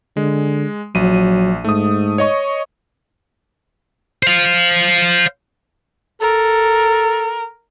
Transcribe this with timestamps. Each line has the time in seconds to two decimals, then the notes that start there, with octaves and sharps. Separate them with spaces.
0.17 D3 G#3
0.95 A#1 F#3 D#7
1.65 G#2 A3 D#6
2.18 C#5 D#5 C#6
4.23 C5 F5
6.21 A4 A#4